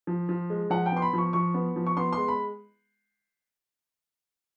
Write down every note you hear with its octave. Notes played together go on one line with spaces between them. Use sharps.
F3
F3
G#3
F3 F#5
G5
B3 C6
B5
F3 C#6
F3 C#6
B3
F3
C#6
B3 C6
C6
G#3
B5